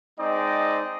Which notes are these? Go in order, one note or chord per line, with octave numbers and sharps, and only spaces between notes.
G#3 C4 D#4 D5 D#5